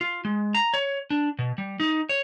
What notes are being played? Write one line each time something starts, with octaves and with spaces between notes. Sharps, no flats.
F4
G#3
A#5
C#5
D4
B2
G3
D#4
C#5